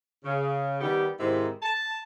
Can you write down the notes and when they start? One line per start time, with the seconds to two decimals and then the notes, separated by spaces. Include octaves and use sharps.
0.24 C#3
0.81 D#3 G3 B3 G4
1.19 G#2 C3 D#3 C4 D#4 E4
1.63 A5